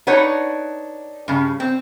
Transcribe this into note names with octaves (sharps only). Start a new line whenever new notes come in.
D4 D#4 B4 C#5 F#5
G2 C#3
C4